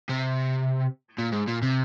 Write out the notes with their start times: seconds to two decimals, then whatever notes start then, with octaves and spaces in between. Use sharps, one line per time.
0.09 C3
1.19 A#2
1.33 G#2
1.48 A#2
1.62 C3